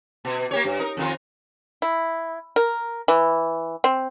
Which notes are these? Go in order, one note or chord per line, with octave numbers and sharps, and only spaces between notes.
B2
A#3 G4 C#5
G2
D#4 A#4
F2 D#3 F4
E4
A#4
E3
C4